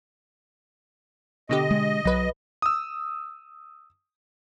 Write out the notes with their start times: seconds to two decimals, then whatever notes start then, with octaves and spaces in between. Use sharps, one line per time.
1.49 B2 D3 G4 D#5
1.71 G#3
2.05 B1 F#3 B4
2.62 D#6 E6